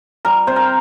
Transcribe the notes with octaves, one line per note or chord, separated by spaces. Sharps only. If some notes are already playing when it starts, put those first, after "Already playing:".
G3 A#4
C3 C5
A#4